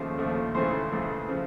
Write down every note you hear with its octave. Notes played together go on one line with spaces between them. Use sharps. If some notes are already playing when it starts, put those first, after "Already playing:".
Already playing: D#2 C#3 F3 A3 C5
D#2 C#3 F3 A3
C#2 C#3 E3 A3 C5
C#2 C#3 E3 A3
C#3 F3